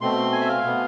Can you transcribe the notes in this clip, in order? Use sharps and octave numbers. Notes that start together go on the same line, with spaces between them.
B2 A3 C4 C6
G#5
E5
F5
B2 B3